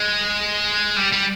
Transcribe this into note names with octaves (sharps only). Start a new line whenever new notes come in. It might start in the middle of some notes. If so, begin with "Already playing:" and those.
Already playing: G#3
G3
G3